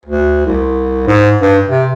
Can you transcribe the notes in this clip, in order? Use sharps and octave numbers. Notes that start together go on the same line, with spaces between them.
D2
C2
G#2
G2
C3